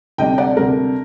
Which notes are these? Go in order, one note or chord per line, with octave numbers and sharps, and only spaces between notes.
D2 C3 G3 D4 D#5 G5
D5 F#5
D2 C3 G3 D4 A#4